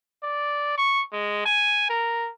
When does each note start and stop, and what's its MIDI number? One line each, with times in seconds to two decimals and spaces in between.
0.23 0.78 74
0.78 1.04 85
1.13 1.45 56
1.46 1.89 80
1.90 2.30 70